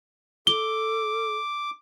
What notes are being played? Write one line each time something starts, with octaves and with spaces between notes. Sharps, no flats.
A4 D6 G7